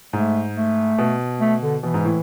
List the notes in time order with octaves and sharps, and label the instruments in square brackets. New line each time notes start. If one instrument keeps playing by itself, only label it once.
[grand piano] G#2 [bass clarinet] A3
[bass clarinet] A3
[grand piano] B2
[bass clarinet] A3
D3
[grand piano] B2 [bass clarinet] E3
[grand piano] G#2
A2